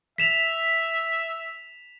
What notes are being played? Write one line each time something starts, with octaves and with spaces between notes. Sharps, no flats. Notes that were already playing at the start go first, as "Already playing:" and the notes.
E5 B6 E7 F7